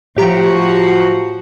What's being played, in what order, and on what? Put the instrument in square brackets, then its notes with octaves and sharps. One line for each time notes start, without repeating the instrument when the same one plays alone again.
[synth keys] A2 G4 A#5 [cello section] F3 F#4